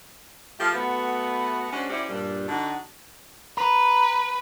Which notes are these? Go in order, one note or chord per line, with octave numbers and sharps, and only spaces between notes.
F3 A3 G4
A3 B3 F#4
G#3 C#4 D4 F#4 C5
C#4 E4 F#4 G4 C5 D5
G2 A#2 G3
D3 D4 D#4 F#4
B4 A#5